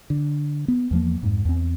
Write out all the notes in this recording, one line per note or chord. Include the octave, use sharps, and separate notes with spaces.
D3
B3
E2 F3 A#3
F2 G#2
E2 C4